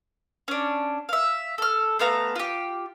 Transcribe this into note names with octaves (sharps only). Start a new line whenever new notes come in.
C#4 D4
E5 F5
A4 F6
A3 B3 F5 A#5
F4 G4